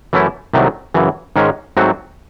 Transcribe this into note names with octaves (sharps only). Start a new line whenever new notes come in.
F#2 E3 A3 C#4 E4
C2 C3 D#3 F#3 A3
F#2 C#3 E3
G#2 D#3 G#3 C#4
G#2 F#3 A3 C4 F#4